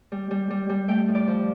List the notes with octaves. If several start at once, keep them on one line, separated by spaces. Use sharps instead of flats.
G3
G3
G3
G3
A3 G5
A2
D5
F3